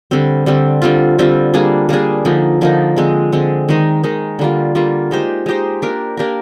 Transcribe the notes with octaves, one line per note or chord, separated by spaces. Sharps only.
D3 G3 C4
D3 G3 C4
D3 G3 C4 F4
D3 G3 C4 F4
G3 A#3 D4 G#4
G3 A#3 D4 G#4
D3 F3 A#3 D#4
D3 F3 A#3 D#4
D3 G#3 C4
D3 G#3 C4
D#3 G#3 D#4
D#3 G#3 D#4
D3 G3 A#3 F4
D3 G3 A#3 F4
G#3 D#4 G4 C5
G#3 D#4 G4 C5
A#3 D4 G4 A#4
A#3 D4 G4 A#4